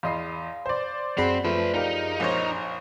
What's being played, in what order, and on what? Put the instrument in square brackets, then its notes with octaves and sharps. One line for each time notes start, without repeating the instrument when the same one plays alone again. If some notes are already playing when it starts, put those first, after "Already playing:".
[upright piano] E2 D#5 C7 [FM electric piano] F5 B5 C6
[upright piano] C5 D5
[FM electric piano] F#2 G#4 D5 [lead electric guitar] C4 [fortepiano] F#4 B5
[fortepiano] F3 [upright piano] A3 [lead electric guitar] A4 B4
[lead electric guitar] D#4 [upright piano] G4 A#4 F5
[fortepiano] A#1 C5 C#5